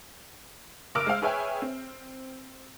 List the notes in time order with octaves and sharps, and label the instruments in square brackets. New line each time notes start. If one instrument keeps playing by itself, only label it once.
[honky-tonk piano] F#1 A#4 D6 E6 F6 D7
G#3 C5 F5
G#4 B4 C#5 E5 G5 G#5
C4